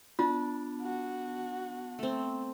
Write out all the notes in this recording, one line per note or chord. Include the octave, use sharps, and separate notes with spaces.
B3 D4 F4 A5
F#4
A3 C4